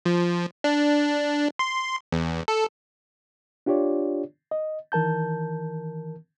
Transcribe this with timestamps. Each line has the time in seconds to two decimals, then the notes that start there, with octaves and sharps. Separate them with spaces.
0.06 F3
0.64 D4
1.59 C6
2.12 E2
2.48 A4
3.66 D4 F4 G4 C#5 D5
4.51 D#5
4.92 D#3 E3 A#4 A5 G6